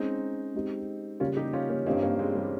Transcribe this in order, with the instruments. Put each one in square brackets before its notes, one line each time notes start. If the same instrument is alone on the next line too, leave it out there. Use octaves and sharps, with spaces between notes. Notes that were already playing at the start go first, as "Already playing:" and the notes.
Already playing: [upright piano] G#3 C#4 G#4 C5 [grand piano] C4 D#4
[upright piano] G#3 C4 D#4 G4
[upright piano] C#3 G3 A#3 [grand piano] C#4 F4
[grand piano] D#4 G4
C#4 F4
A#3 C#4
[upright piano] G2 G3 C4 D#4 [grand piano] A#3 C#4
[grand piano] A#3 C#4
G#3 C4
G3 A#3